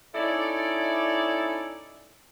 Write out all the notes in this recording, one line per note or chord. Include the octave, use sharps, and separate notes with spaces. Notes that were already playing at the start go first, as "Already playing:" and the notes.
C#4 D#4 E4 A4 D5